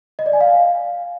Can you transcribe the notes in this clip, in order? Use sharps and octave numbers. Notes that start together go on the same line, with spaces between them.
D#5
D5
G#5
F5